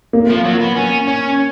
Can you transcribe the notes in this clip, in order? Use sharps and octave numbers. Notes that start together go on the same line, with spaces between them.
A#3
F3
F#3
B3
C#4
C#4